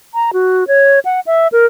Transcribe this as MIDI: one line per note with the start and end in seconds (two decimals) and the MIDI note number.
0.14 0.31 82
0.33 0.67 66
0.68 0.99 73
1.05 1.20 78
1.27 1.48 76
1.52 1.66 70